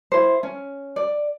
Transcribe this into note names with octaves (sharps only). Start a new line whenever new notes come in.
E4 C5
C#4
D5